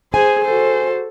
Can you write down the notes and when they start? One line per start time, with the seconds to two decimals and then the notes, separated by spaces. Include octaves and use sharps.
0.14 G#4 C5 G#5
0.44 F#4 A4 C5